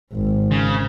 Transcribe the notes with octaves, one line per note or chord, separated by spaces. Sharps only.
G#1
C#3